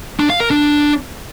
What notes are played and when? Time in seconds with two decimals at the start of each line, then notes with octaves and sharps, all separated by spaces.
0.20 D4
0.30 F5
0.40 A#4
0.51 D4